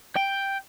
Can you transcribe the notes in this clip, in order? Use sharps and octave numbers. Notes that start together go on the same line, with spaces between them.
G5